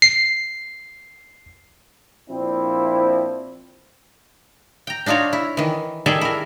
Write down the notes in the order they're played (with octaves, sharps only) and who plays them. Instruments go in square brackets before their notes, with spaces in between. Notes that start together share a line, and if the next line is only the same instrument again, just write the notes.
[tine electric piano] C7
[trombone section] A#2 F3 C4 D4 E4 C5
[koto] G5 A#5
D4 D#4 F4 F#4 C#5
E4
D#3 E3
D#3 G3 G#4 A4 E5 G#5
E4 A#4